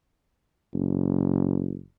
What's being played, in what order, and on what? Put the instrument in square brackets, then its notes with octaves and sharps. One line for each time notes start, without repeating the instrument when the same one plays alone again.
[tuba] F#1